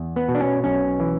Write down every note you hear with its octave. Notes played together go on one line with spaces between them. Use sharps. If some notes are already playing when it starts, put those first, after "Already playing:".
Already playing: E2
B3
B2
D4
C#4
B1 C#4
E3